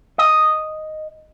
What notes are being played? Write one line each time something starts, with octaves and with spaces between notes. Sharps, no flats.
D#5